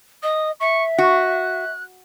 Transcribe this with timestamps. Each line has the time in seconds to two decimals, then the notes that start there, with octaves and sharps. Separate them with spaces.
0.23 D#5 D#6
0.60 E5 C#6
0.98 F#4 F#6